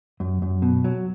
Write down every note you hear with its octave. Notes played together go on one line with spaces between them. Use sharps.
F#2
F#2
B2
F#3